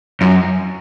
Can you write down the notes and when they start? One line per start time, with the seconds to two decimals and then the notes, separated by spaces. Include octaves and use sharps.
0.21 F#2